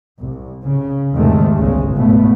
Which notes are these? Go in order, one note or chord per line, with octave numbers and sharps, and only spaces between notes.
C2
C#3
E2 G#2 C3 D#3 G#3 A3
G1 C#2 C#3 G#3
G#2 B2 A3 B3